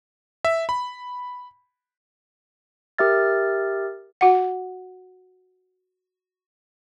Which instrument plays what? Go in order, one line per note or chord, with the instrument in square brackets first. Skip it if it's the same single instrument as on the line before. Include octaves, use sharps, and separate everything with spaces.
[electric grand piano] E5
B5
[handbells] G4 A#4 E5 F6 A6
[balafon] F#4 F#5